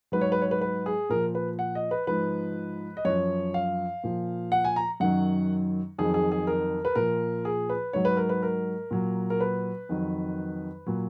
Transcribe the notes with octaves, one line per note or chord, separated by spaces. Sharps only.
G#2 F#3 B4
C#5
B4
C#5
B4
B4
G#4
A#2 F3 A#4
B4
F#5
D#5
B4
G#2 F3 B4
D#5
F#2 F3 C#5
F5
A#2 F3
F#5
G#5
A#5
F#2 D#3 F#3 F#5
F2 D#3 F#3 G#4
G#4
G#4
A#4
B4
A#2 F3 A#4
G#4
B4
G#2 F#3 C#5
B4
A#4
B4
A#4
A#2 F#3
A#4
B4
F2 D#3 F#3
A#2 F#3